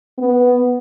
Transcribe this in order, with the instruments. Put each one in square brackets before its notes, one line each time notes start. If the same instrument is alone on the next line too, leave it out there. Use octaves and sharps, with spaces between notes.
[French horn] B3